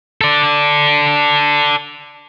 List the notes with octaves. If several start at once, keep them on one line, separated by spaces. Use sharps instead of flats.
A4 D5